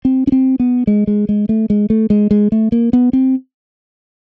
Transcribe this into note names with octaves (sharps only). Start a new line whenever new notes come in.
C4
C#4
C4
B3
G#3
G#3
G#3
A3
G#3
A3
G#3
G#3
A3
A#3
B3
C4